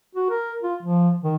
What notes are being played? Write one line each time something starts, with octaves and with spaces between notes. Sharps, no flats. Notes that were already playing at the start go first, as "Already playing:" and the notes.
F#4
A#4
F4
F3
D#3